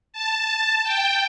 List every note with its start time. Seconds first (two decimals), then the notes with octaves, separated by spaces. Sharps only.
0.13 A5
0.83 G5